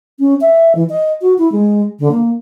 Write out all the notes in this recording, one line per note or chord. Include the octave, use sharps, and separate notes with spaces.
C#4
E5
E3
D#5
F#4
E4
G#3
D3
A#3